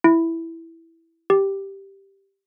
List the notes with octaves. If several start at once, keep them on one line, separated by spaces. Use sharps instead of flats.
E4
G4